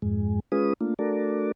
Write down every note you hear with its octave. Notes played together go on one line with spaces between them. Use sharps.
F2 G#2 G#3
G#3 C#4 F4 G#4 B4 D#6
A3 A#3 D4 F4
A3 D4 F#4 A4 A#4 D5